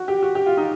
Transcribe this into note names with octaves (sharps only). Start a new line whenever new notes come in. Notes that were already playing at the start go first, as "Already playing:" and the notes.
Already playing: F#4
G4
F#4
G4
F4
D#4